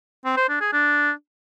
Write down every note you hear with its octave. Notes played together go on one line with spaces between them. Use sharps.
C4
C5
D4
G#4
D4